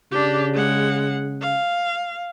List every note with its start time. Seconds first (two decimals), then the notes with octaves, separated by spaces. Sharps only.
0.11 C#3 D4 G4
0.53 G#3 F#5
1.42 F5